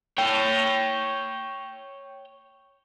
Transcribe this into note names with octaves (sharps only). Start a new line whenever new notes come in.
C#5 G5